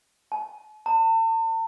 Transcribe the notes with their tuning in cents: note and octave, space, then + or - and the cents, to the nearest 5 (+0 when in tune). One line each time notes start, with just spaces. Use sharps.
A5 -45
A5 +40